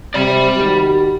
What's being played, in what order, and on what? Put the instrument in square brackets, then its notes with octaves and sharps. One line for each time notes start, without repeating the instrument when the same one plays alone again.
[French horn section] C3 [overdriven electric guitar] D5 B5
[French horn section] D#3 F#4 G4